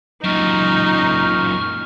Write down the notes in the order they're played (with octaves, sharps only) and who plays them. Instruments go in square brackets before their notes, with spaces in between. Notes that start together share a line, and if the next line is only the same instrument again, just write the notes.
[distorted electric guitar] F#2 A#2 [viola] D#4 [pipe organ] C#6 F6